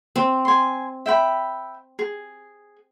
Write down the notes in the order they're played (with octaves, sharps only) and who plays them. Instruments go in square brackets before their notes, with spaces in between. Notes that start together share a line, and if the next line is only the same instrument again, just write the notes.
[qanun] C4
[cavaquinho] G#5 C6
E5 G5 B5
G#4